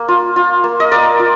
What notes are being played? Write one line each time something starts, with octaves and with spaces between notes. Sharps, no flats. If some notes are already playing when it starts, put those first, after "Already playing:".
Already playing: A#3
F4
F4
A#3
D#5
A#3 A#4 D5
F4